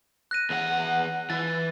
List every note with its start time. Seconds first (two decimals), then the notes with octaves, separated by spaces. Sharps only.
0.31 F#6 A#6 D#7
0.50 E2 F#5
1.30 E3 A6